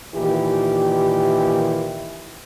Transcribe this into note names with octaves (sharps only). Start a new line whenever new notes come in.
A#2 D#3 E3 G4